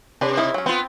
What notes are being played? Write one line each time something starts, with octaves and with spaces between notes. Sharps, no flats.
C3 D4 B4
D#3 E4
F#3 C#4
B3 C4 F4